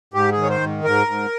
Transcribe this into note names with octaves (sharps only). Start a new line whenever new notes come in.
G#2 G4
G#4
D#3
C#5
C5
G#2
G#2 A#4
G#2